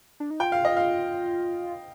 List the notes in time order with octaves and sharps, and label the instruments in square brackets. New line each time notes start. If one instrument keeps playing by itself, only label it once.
[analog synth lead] D4
D#4
[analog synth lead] F4 [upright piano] G5
[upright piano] F5
D#5
F5